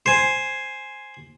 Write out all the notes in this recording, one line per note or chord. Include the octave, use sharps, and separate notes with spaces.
C5 G#5